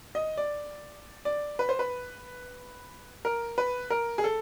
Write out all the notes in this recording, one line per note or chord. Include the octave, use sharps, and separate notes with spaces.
D#5
D5
D5
B4
C5
B4
A#4
B4
A#4
G#4
A4